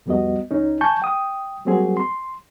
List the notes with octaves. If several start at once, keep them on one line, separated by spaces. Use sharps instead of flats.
C2 F2 G3 B3 F#4 D#5
C#2 C#4 D#4
G#5 A5 C#6 G6
G5 D#6
F#3 G3 A#3 C4 F#4 G#4
C6